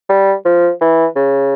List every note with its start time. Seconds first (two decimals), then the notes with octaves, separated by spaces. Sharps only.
0.09 G3
0.45 F3
0.81 E3
1.16 C#3